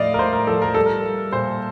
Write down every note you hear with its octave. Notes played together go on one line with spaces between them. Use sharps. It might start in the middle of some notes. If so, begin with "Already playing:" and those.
Already playing: A2 F3 D5 D#5 F5
A#4
A2 C5
A#4
F3 A4
A#4
G3 A4
A#4
G3
A#2 C5